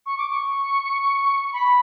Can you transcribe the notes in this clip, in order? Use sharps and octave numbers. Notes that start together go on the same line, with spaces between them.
C#6
D6
C#6
C#6
B5